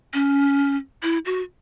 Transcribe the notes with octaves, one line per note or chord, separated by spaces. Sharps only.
C#4
E4
F#4